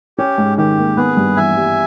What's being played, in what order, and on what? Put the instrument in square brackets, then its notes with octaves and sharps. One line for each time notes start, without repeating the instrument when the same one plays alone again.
[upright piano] C#4 [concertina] G4
[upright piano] G#2
[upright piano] D#3 [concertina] G4
[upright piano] A#3
[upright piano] B3 [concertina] G#4 B4
[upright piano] G2
[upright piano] E3 [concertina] E5 G#5
[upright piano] G3